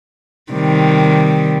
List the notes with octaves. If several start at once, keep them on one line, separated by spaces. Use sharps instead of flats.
C3 D#3 G3